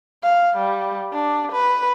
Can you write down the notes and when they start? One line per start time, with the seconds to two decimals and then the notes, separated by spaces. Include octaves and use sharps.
0.23 F5
0.57 G3
1.13 D4
1.52 B4